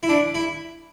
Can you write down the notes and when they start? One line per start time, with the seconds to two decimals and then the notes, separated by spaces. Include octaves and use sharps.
0.03 E4
0.09 D4
0.35 E4